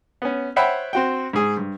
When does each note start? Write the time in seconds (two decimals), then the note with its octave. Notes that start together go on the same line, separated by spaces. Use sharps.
0.22 B3 C#4
0.56 C5 C#5 E5 F#5 G5 B5
0.93 C4 F#4 G5
1.33 G#2 G#4
1.57 G2